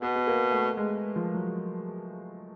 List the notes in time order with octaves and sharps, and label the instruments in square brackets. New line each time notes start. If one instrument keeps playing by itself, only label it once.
[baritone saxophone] B2 [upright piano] B3
[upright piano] B3
A#3
A3
G#3
F3
F#3